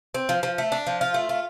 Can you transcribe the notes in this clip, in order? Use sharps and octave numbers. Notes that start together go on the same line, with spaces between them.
C4
F3
F3
A3
D4
F3
F4
A3
F4